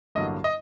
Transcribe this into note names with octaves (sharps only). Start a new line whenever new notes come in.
A1 G2 D3 F#3 A#3 D#5
D#5